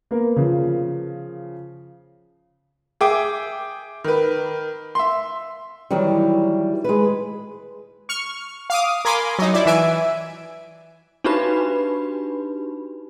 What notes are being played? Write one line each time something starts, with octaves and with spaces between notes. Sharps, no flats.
A#3 B3 A#4
C#3 F3
G#4 E5 G5 D6
D#3 B4
E5 C6
D#3 E3 F#3 G3
G#3 B4
C#6 F6
F5 D6 D#6
A#4 G#5 B5 C6 D6
F#3 D#4
E4 D5
E3 E5 G#5 D7
D4 D#4 F#4 G4 B4 B5